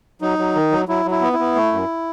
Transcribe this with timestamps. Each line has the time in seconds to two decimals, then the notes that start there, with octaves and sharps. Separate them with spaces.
0.21 F#3 D#4
0.39 F#3
0.55 D#3
0.72 F#3
0.89 F#3 E4
1.06 F#3
1.11 E4
1.22 B3
1.33 E4
1.39 B3
1.55 A3
1.72 F#2